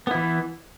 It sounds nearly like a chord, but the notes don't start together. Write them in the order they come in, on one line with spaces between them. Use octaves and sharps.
B3 E4 E3